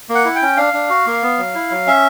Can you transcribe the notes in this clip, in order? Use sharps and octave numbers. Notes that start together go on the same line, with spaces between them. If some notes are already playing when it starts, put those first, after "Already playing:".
A#3
F#5
E4
G5
C#4
D4 F5
D4
F#4
A#3
B3
F#3
E4
F#3
C#4 E5